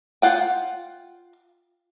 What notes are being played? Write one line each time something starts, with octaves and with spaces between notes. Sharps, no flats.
F4 F#5 G5